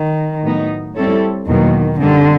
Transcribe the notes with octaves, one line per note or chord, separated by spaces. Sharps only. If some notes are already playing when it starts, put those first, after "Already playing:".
Already playing: D#3
A2 F#3 B3 D#4
G3 C4 E4 A4 C#5
E2 B2 D#3 F#3 A#3
F#2 D3 D#3 G3 C4